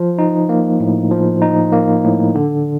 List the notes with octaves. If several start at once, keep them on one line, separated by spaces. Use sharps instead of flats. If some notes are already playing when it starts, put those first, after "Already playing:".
Already playing: F3
D#4
A#3
A2
F3
D#4
A#3
A2
D3